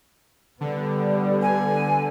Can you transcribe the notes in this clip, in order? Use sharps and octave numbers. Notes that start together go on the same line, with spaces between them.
D3 G3 B3
G#5